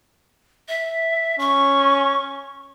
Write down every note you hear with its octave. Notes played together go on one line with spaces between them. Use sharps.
E5
C#4 C#6